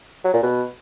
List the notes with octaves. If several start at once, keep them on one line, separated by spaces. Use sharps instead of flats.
F#3
A#2
B2